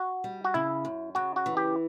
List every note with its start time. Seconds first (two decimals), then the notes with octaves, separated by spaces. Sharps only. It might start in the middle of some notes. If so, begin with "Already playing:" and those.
Already playing: F#4
0.24 G3
0.44 F#4
0.54 C#3 E4
0.85 F#2
1.15 C#3 F#4
1.36 F#4
1.46 E3
1.57 G4